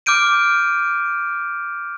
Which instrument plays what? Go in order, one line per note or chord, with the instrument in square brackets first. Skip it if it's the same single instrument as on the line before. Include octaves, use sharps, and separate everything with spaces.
[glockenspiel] D6 F6 G6 D7 D#7